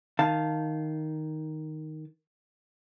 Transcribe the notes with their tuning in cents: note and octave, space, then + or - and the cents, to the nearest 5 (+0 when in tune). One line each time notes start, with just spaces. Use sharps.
D#3 +0 F5 +0 A5 +0